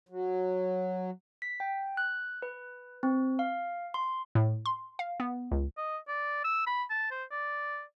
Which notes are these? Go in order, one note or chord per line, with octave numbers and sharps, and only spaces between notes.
F#3
B6
G5
F#6
B4
C4
F5
C6
A2
C6
F5
B3
C#2
D#5
D5
E6
B5
A5
C5
D5